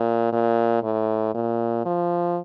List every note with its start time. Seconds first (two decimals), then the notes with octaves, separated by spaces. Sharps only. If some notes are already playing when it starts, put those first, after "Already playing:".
Already playing: A#2
0.33 A#2
0.83 A2
1.35 A#2
1.85 F3